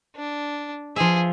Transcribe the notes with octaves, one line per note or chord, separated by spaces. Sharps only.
D4
F3 G#4 E5